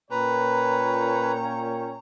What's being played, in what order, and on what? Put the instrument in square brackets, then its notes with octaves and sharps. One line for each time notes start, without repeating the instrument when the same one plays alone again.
[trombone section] A#2 [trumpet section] C#4 C#5 G5 [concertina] B4 [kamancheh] A#5